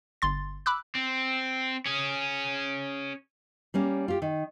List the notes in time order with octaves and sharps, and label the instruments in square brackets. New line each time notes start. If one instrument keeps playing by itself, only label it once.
[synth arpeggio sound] G1 C6 A6
B5 D6 E6 F#6
[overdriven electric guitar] C4
C#4 G#4
[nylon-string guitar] G3 A#3 C#4
F4 G4
D#3